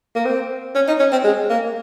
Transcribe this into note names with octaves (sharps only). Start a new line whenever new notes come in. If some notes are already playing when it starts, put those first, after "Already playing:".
A#3
C4
C#4
D#4
C#4
C4
G#3
A#3